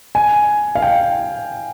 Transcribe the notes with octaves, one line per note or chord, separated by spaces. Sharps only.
G#5
F5
G5